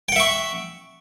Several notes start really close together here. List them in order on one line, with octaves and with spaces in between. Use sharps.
G5 F#5 E5 C#6